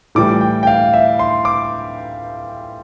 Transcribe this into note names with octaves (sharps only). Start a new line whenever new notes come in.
A2 E3 G3 D6
G5
G5
F5
E5
C6
D6